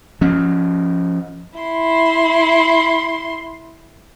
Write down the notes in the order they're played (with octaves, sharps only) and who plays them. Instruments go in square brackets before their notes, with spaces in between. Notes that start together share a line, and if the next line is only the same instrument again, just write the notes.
[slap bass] F3 C#4
[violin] E4 C6